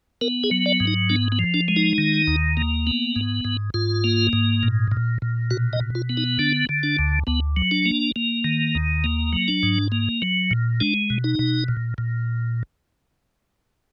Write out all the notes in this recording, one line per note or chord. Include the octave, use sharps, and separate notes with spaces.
B3 A#4
G#4
F#3
D5
G#2
D#4
B3 D4
B3
F3
D4
G#3
D#4
D#3
D#2
A#3
B3
G#2
G#2
G#2 F4
A#3
G#2
A#2
A#2
A#2
B2 F#4
D#5
B2
F4
B3
D#4
D3 D4
D3
D4
D2
D2 B3
F#3
D4
A#3
A#3
D#3
D#2
A#3
F#3
D4
G#2
A#3
F#3
A#2
G#3 D4
B2
D#4
B2
A#2
A#2